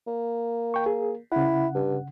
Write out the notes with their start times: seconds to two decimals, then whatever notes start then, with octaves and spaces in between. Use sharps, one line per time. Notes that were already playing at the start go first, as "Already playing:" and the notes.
0.07 A#3
0.74 G5 C#6
0.86 G#4
1.32 C#3 E4 F#5
1.75 G2